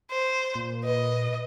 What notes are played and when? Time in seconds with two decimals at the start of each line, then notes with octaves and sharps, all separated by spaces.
0.11 C5
0.55 A#2
0.85 B4 D#5